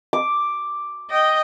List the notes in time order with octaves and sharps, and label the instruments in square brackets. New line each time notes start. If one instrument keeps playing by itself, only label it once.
[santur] D6
[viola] D#5 G5